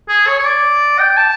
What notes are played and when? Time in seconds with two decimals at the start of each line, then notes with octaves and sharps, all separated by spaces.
0.09 G#4
0.27 C#5
0.39 C#5
0.45 D5
0.99 G5
1.17 A5